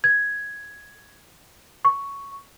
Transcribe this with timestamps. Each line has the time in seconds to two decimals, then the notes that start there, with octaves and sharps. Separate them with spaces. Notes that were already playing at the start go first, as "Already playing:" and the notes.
0.04 G#6
1.85 C#6